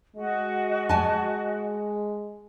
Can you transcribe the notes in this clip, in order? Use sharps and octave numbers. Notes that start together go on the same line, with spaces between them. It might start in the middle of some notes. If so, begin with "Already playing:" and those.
G#3 F#4 D#5
G#5 A5